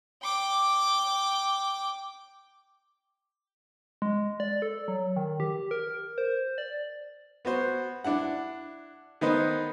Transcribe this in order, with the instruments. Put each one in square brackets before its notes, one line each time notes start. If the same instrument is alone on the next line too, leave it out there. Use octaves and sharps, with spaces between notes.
[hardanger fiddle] G5 D6
[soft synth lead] G#3
D5
A4
F#3
D#3
G4
A#4
C5
D5
[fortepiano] B3 F#4 C5
D4 E4 F#5
D#3 B3 D#4 B4 C5